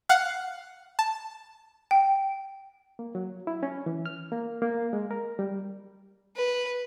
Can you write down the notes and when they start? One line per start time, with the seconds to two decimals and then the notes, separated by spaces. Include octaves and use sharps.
0.09 F5 F#5
0.99 A5
1.91 G5
2.99 A#3
3.15 F#3
3.47 E4
3.63 C#4
3.86 E3
4.06 F6
4.32 A#3
4.62 A#3
4.93 G#3
5.11 A#4
5.39 G3
6.36 B4